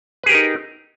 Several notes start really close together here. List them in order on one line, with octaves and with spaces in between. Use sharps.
B4 G#4 G4 A#4 D#4